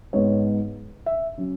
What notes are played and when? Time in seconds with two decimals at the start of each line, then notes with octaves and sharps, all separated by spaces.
0.13 G#2 G#3 B3 C#5
1.06 E5
1.38 F#3 C#4